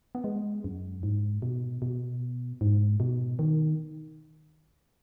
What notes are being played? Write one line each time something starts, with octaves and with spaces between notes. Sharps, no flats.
B3
G#3
F#2
G#2
B2
B2
G#2
B2
D#3